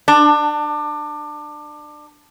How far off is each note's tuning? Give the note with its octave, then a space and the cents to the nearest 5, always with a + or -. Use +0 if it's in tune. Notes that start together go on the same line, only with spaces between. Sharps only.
D4 +25